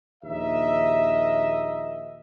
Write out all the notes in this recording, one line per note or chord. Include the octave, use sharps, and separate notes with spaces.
A#1 D#2 A#4 D#5 E5